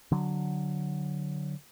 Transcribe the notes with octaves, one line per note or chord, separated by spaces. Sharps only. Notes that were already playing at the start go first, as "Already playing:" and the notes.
D3 F#3